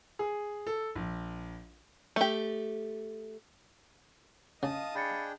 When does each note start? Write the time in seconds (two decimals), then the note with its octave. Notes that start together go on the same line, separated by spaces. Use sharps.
0.19 G#4
0.67 A4
0.96 A#1
2.16 A3 G4
4.63 C#3 D#5 F5 A5 D#6
4.95 D4 G#4 G5 B5 A6 C#7